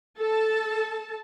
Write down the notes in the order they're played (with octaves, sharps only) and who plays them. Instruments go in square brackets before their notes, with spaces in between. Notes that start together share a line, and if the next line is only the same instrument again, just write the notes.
[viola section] A4 A5